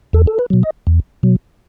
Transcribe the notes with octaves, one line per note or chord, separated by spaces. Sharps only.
E2 A4
A4
B4
B2 F#3
D#5
E2
B2 F#3